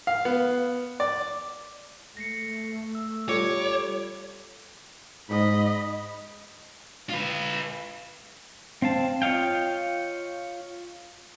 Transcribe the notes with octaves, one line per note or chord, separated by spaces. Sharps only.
F5
B3
D5
A3 A#6 C7 C#7
E6
G3 F4 A4 C#5 D5 D6
G#2 D#5 B5
F4 B4
C4 F5 A5
F4 C#5 D#5 F5 G5